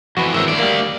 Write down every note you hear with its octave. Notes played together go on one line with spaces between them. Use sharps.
F2 E3 F#4 B4
G#1 E3 A#4 C#5 E5
D2 D5
G3 A#3